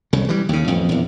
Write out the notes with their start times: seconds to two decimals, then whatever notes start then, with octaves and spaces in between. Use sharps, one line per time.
0.13 C2 C#3
0.29 E3 G3
0.49 D#2 C#3
0.68 A1 F2
0.89 A#1 E2